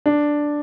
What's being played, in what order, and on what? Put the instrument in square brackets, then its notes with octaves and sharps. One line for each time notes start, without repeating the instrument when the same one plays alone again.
[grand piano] D4